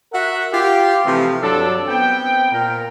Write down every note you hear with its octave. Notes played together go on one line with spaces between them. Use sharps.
F#4 A#4 E5 F#5
F4 G4
C3 E3 F3 A3 C4
G2 F#3 D4 A4
B3 C4 G5
A#2 A#4